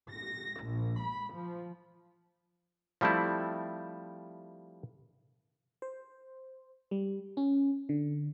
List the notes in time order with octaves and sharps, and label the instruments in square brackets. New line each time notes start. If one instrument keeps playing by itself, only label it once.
[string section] A#6
A#1
B5
F3
[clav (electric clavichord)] F3 G3 A3 C4 E4
[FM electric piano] C5
G3
C#4
D3